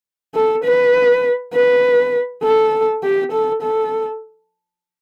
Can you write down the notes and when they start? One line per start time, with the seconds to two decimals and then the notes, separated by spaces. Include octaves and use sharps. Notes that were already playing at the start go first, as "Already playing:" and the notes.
0.35 A4
0.64 B4
1.53 B4
2.43 A4
3.03 G4
3.32 A4
3.62 A4